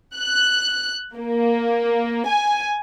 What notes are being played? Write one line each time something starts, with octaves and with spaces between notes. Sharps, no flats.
F#6
A#3
G#5